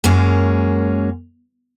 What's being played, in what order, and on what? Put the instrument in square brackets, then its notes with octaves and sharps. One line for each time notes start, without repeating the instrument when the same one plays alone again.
[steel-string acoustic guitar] F#2 G#3 A#3 C#4